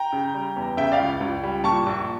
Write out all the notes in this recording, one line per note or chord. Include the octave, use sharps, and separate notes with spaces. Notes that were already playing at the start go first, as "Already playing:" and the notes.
Already playing: G5 A#5
C#3
G3
E2
C#3 E5 G5
D5 F5
C#2
C#2
G3
A#2 A5 C#6
A#1